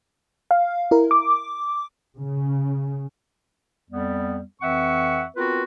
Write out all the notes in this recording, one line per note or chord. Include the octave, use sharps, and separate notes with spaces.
F5
E4 A#4
D6
C#3
F2 G3 B3
F2 E3 C4 E5 F#5 C#6
B3 C4 F4 F#4 A#4 B4